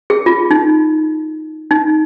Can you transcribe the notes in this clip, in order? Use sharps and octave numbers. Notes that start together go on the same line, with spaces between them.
G#4
F4
D#4
D#4